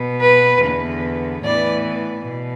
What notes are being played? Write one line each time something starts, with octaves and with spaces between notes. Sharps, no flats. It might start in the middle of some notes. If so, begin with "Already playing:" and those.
Already playing: B2 B3
B4
E2 D3 B3
A2 E3 B3 D5
B2